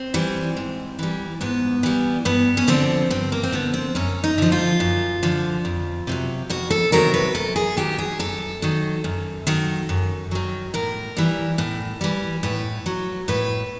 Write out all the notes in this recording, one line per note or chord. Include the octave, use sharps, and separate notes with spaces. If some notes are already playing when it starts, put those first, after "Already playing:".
Already playing: C4
E3 G3
G#2
E3 G3
G#2 B3
E3 G3
G2 B3
C#4
D3 F3 C4
G2 C4
A#3
C4
D3 F3 B3
C4
F#2 C#4
D#4
D3 F3
F4
F#2
D3 F3
F2
C3 D#3 F#3
F2 F#4
A4
C3 D#3 F#3 A#4
B4
F#2 A4
G#4
D#3 F#3 G4
G#4
F#2 A4
D#3 F#3
F#2
D#3 F#3
F#2
D#3 F#3
A2 A#4
E3 G3
A2
E3 G3
A2 B4
F#3
A2 B4